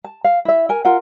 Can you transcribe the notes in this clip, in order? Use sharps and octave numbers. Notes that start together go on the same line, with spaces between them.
A5
F5
E4 E5
A#4 G#5
F4 A#4 F#5